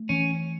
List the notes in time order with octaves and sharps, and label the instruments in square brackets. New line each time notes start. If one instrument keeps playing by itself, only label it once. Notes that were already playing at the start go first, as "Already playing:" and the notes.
Already playing: [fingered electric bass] A3
[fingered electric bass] E3 [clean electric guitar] C#4